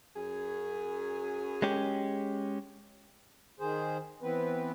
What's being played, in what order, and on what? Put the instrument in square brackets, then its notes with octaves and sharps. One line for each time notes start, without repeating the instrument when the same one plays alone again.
[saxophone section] F#2 G#4
[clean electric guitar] G#3 C#4 G4
[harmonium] D#3 G#4 C5
E3 B3 C4 B4